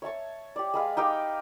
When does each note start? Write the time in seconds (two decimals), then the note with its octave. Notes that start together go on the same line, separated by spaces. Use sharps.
0.02 C#5 E5 A5 C#6
0.56 G4 D5
0.74 G#3 B4 F5
0.97 D#4 G4 F5 G5